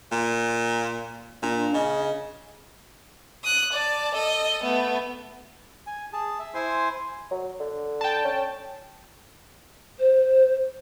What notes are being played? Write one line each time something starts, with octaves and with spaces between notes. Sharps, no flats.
A#2
A#2 D4
C#3 D#5
D#6 F#6
D5 A5
A4 D#5
A3 B3
G#5
G#4 A5
E5
E4 C5 G#5 C6
F#3
D3
G5 A5
C#4
C5